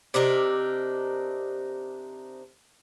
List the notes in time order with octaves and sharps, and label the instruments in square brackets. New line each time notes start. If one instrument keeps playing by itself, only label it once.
[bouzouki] C3 D4 D#4 A#4